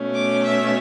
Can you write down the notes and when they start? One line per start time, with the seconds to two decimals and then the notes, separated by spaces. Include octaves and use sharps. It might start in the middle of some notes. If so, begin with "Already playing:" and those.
Already playing: B2 A3 C#4
0.13 D6
0.43 E5